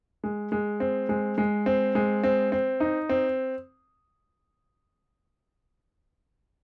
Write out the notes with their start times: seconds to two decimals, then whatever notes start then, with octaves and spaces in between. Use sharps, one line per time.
0.24 G#3
0.52 G#3
0.80 C4
1.09 G#3
1.38 G#3
1.66 C4
1.95 G#3
2.24 C4
2.52 C4
2.80 D#4
3.10 C4